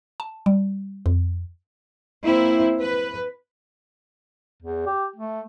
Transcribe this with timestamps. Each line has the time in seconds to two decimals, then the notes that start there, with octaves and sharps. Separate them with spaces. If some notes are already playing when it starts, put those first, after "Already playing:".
0.20 A5
0.46 G3
1.06 F2
2.23 A#3 C4 E4
2.81 B4
4.62 E2
4.86 G4
5.16 A3